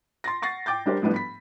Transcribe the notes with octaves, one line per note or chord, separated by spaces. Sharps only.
C6 A6 A#6
F#5 C#6 A6 A#6 C7
G5 D6 G6 A6
G3 D4 G4 A#4 C5
A2 F3 G3 B3 D4
B5 B6